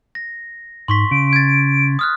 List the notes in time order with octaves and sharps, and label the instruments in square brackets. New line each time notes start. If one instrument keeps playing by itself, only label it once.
[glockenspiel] A#6
[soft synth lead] G#2 [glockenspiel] C6 C#6 B6
[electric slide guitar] C#3 [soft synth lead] D7
[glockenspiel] G#6 A6
D#6 F6 F#6